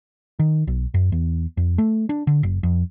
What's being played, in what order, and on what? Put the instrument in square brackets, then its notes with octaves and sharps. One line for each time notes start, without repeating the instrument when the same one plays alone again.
[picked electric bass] D#3
B1
F#2
E2
F2
A3
D4
D3
F#1
F2